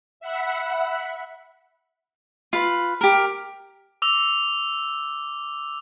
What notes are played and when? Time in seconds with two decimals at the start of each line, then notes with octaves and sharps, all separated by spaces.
0.20 E5 F#5 B5
2.53 F4 B4
3.01 G4 A#4
4.02 D6 E6 F7